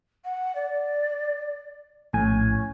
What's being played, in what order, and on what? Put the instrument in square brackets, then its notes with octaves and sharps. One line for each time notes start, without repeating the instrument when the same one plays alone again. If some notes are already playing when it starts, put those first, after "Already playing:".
[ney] F#5
D5
[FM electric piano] A#1 A2 G#5 [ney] C#4